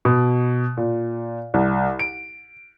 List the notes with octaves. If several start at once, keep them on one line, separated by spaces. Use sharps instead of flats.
B2
A#2
C2
D7